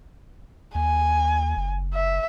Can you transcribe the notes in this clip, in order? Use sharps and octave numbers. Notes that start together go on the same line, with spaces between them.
D#2 G#5
F#1
E5